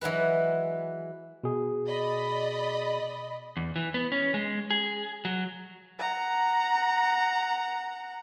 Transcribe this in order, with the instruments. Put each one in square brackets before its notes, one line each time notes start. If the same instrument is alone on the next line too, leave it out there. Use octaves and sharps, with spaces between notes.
[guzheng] E3 F#3 G#3 B4
[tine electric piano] B2 G#4
[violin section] D5 D#5 B5
[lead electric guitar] E2
E3
B3
C#4
G#3
G#4
F#3
[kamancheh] F#5 A#5